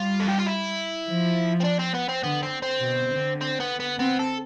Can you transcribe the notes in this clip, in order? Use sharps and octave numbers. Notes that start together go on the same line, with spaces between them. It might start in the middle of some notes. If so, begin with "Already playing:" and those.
Already playing: G3 F4
A4
G4
F4
E4
F3
C4
D4
C4
B3
C4
D3 B3
C4
C4
B2
D3
C4
B3
B3
B3 C4
A4